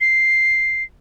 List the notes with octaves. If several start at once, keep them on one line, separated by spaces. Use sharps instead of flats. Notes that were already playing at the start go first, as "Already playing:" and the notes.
C7